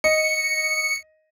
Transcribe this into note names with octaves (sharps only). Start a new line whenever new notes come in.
D#5 C#7